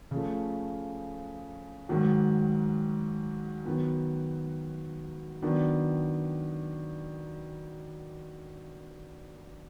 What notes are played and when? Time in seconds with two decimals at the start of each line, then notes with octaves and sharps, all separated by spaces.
0.11 C#3 F3 A3
1.89 G#2 D#3 F#3
3.65 D#3 F#3 B3
5.42 D#3 F#3 B3 D4